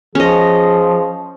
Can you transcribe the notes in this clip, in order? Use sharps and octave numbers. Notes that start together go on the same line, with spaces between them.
F3 C#4 G#4 D#5